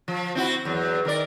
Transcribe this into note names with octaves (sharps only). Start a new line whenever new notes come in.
F3
C4 E4 F#4
E2 F#3
D#3 A#4 D5